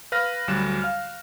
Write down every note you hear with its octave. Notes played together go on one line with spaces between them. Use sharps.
B4 F5 F6 A#6
D2 F#3 G3 F#6 E7
F5 F6